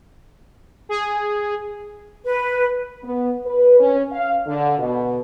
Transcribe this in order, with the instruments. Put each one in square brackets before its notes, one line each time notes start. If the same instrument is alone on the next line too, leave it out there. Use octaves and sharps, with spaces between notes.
[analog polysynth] G#4
[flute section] B4
[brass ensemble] B3
B4
C#4
F5
D3
B2